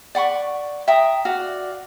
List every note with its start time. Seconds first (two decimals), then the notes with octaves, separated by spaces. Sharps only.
0.15 D5 F#5 B5 C#6
0.88 E5 G5 A#5 D#6
1.25 F#4 D5 F5